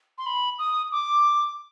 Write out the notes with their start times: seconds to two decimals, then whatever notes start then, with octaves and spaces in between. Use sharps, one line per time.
0.18 C6
0.26 B5
0.59 D#6
0.92 D6